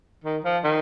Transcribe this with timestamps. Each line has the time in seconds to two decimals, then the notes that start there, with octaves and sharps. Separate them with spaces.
0.24 D#3
0.44 F3
0.64 D#3